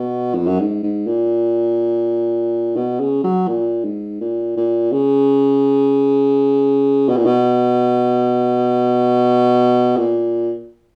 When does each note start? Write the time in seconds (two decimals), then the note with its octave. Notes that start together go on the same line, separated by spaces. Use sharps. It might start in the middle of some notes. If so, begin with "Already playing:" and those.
Already playing: B2
0.35 F2
0.46 F#2
0.60 G#2
0.83 G#2
1.07 A#2
2.76 B2
3.00 C#3
3.24 F#3
3.48 A#2
3.84 G#2
4.21 A#2
4.57 A#2
4.92 C#3
7.09 B2
7.17 A#2
7.26 B2
9.97 A#2